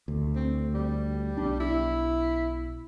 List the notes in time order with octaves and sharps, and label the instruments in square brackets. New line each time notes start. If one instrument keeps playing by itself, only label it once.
[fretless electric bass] D2
[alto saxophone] C4
G3
[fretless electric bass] B1 D4
[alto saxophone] E4